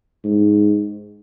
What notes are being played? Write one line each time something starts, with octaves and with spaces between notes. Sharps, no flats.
G#2